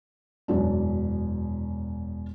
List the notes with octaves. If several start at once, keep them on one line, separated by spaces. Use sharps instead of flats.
E1 F#2 D4